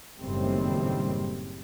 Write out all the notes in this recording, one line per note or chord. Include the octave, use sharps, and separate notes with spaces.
F#1 A2 D#3 G3 C4